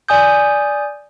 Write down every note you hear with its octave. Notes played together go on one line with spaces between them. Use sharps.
D5 G#5 D#6 G6